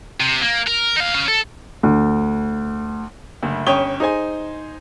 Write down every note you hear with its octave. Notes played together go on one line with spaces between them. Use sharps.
C3
A#3
A#4
D#4 F5
C#4 F5
A4
D2
F#1 D2
G1 C#4 C#5 G5 D#6 G7
D#4 G#4 C5 G#5